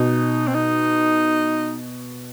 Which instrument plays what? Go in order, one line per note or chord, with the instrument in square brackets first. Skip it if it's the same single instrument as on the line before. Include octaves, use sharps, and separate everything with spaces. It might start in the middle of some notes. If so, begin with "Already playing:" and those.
Already playing: [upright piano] B2 [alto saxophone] D#4
[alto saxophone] C4
D#4